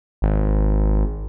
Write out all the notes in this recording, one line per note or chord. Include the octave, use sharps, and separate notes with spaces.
G#1